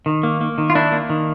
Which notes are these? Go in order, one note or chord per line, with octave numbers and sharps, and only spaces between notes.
D#3
A#3
A#3
D#3
F4
A#3 D4 E4
A#3
D#3